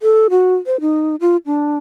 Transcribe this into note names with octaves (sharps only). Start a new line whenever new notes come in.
A4
F#4
C5
D#4
F4
D4